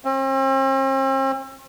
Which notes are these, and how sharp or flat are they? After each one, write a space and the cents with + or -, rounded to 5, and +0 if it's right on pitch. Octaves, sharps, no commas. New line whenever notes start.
C4 +45